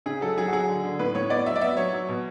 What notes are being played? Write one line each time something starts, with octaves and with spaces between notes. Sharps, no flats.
C#3 G#4
F#3 A4
F#3 G#4
F#4
F#3 G#4
D3
D3
A2 B4
A2 C#5
B3 D5
F#3 E5
D5
B3 E5
F#3 C#5
F#3
B2